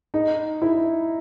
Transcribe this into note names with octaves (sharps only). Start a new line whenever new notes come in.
D#4
E4